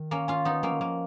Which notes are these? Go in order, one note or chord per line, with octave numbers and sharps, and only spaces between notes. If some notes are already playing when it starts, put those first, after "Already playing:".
Already playing: D#3
A#3 C#4
C#4 F4
B3 D#4
F3 A#3 C#4
D#3
F3 A#3